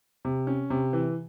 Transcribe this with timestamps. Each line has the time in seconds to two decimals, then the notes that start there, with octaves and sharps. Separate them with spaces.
0.25 C3
0.47 C#4
0.70 C3
0.93 E3